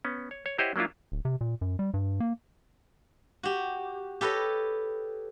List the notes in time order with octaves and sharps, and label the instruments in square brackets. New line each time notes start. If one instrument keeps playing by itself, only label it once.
[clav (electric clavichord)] B3 C#4
C#5
C#5
E4 G4 C5 C#5 D#5 F#5
F#3 A#3 D4 E4 F4
[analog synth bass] D1
C3
A#2
F#2
G3
G2
A#3
[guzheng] F#4 G4
G4 A4 B4 C#5 D#5